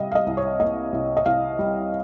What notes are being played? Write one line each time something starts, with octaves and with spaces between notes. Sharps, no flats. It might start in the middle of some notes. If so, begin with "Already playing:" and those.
Already playing: C3 G3 D#5 F5
F5
D#5
C2
C#5
A#3 D#5
C2
D#5
C2 F5
G3